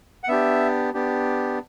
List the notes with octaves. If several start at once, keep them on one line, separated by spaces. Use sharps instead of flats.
F#5
B3 D4 G4 E5
B3 D4 G4